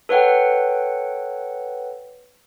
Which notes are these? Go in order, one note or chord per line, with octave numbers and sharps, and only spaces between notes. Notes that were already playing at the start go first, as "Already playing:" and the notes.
A4 B4 C#5 F#5 G5